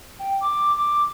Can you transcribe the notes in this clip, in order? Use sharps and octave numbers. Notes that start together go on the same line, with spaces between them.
G5
D6
D6